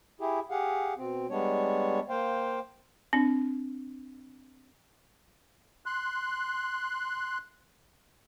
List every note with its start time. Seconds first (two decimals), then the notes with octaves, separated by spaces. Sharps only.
0.20 E4 G4 G#4
0.50 G4 G#4 F5 F#5
0.98 B2 C4
1.30 G3 G#3 B3 D4 C#5
2.09 A#3 C5 F5 G5
3.13 C4 D4
5.86 C6 F#6